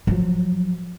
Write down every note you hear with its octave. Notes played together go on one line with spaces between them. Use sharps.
F3 F#3